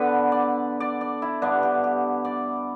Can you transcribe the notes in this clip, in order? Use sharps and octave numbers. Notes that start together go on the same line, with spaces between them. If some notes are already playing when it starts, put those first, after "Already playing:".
Already playing: D3 B3 D4 A4 B4
D5
D5
D5
E4
G2 D3 B3 D4
G4
G4
D5